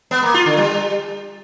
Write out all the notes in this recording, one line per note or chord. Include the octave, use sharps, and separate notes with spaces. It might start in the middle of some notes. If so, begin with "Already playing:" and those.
B3
A#3
F4
D3
G3